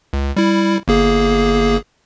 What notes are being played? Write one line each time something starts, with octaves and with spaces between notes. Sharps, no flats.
C#2
G3 E4
G1 A#3 G#4